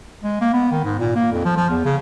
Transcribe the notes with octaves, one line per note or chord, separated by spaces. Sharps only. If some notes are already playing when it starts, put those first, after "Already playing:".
G#3
A#3
B3
D#3
G#2
A#2
A#3
F2
F3
F3
E2
C#3